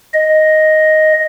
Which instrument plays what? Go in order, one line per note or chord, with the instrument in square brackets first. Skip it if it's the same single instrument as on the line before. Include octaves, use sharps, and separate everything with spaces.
[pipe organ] D#5